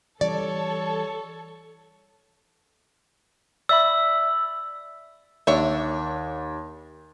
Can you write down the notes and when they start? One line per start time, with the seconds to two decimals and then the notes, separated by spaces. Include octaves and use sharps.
0.21 E3 G3 C#4 A4 C#5 D5
3.69 D5 E5 B5 E6
5.47 D#2 D4 C#5 E5